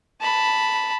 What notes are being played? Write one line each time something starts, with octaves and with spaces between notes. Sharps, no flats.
A5 B5